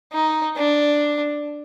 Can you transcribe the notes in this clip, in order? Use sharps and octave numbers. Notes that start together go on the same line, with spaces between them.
D#4
D4